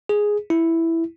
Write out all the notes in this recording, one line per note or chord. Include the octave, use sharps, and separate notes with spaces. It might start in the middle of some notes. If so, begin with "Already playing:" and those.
G#4
E4